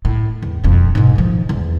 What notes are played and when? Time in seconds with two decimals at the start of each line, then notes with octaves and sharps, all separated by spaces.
0.05 A2
0.43 E2
0.64 E1 F2
0.95 G#2 B2
1.16 D#3 F3
1.49 E2